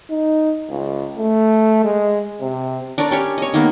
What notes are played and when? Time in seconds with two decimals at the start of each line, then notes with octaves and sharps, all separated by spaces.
0.10 D#4
0.70 C#2
1.17 A3
1.84 G#3
2.40 C3
2.98 D4 A#4 C#5 D5
3.11 C#4 G4 C#5
3.38 C#5 D#5
3.54 D#3 A#3 B3